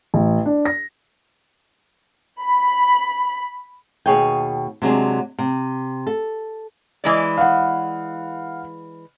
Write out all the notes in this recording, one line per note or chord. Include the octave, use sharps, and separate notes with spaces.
A1
D4
A#6
B5
D#2 B2 G#4 C#5 D#5 G5
C3 F#3 G#3 D4
C3
A4
E3 G#3 D5
F5 F#5